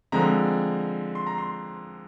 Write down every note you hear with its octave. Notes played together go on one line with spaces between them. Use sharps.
D3 F3 G#3 C4 A#5
C6
A#5
C6